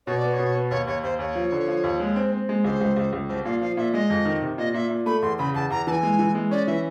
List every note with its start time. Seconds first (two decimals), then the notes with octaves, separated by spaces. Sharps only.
0.07 B2 C#5
0.18 D5
0.23 B3
0.28 D5
0.33 C#5
0.39 B2
0.55 B3
0.71 D#2 C#5
0.87 D#2 C#5
1.03 D#2 C5
1.19 D#2 C#5
1.35 F3
1.52 D3
1.68 F3
1.84 D#2
2.00 G#3
2.16 C4
2.32 C4
2.49 G#3
2.64 C#2 C5
2.81 C#2
2.97 C#2
3.13 C#2
3.29 C2 C5
3.45 A#2 F5
3.61 F3 F5
3.77 A#2 E5
3.94 G#3 D#5
4.10 F2
4.25 D#3
4.42 C3
4.58 A#2 D#5
4.74 A#2 E5
4.90 A#2
5.06 A3 B5
5.22 E2 C6
5.38 C#3 B5
5.54 E2 A5
5.70 E2 A#5
5.87 E3 A5
5.91 G#5
6.03 G#3
6.19 E3
6.35 G#3
6.51 C#4 D5
6.67 E3 E5